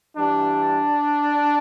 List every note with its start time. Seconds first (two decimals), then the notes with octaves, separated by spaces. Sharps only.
0.16 G2 E3 G3 D4